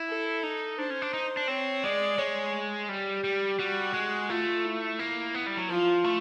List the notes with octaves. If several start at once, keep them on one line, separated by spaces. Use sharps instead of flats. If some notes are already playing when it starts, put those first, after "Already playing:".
Already playing: E4
A4
D#4
D4 C5
C#4
D4
D#4
D4
C4 C#5
G#3 D5
G#3 C#5
G3 G4
G3
G3 F#4
G#3
A3 F4
E4
A#3
B3
G3
F#3
F3 F4
A3